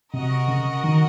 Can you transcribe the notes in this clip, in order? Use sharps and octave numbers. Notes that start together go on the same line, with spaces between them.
C3 F#4 A#4 D#5
C#3
D#3